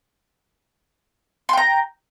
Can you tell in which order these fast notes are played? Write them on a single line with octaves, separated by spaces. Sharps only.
C6 G5 A#5